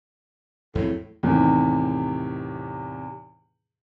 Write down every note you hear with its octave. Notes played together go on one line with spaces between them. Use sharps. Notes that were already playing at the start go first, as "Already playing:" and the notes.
E2 A2 F#3 C4
E2 A2 C3 D#3